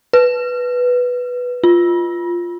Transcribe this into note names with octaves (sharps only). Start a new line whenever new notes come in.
B4
F4